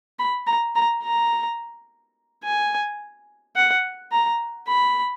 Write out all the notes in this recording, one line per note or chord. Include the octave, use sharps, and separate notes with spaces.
B5
A#5
A#5
A#5
G#5
F#5
A#5
B5